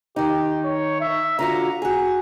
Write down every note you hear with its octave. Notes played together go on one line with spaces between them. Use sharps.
D#3 D#4 G4
C#5
E5
D3 F4 F#4 A#5
F#4 G#4